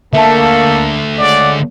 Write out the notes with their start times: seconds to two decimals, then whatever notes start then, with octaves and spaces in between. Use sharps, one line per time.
0.13 D3 A3 A#3 A4 E5 A5
1.18 C#3 G#3 D5 F#5